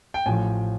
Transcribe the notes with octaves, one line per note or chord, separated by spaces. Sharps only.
G5
A1 A2 F3 G#5